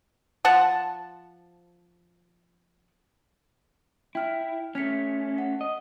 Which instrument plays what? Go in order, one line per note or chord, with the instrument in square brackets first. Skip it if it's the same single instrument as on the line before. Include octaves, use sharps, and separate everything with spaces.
[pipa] F3 F#5 A5
[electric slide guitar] E4 [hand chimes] G5 F6
[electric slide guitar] A3 C#4 [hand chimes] F6 B6 C#7
[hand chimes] F#5
[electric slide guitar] D#5